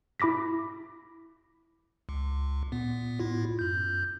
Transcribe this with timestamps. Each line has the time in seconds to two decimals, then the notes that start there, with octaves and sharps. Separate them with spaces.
0.20 E4 B5 D6 A#6 B6
2.09 C#2
2.72 A#2 B3
3.20 A2 E4 F4
3.59 F#2 G6